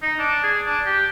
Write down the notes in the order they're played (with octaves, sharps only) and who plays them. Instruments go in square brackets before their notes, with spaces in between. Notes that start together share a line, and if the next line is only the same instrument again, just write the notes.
[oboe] D#4
D4
G#4
D4
G4